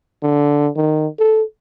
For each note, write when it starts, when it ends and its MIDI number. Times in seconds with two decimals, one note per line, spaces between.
0.23 0.70 50
0.76 1.07 51
1.19 1.43 69